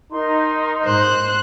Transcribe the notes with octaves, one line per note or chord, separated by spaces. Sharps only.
D#4 A#4 C6
G#2 C5 F#6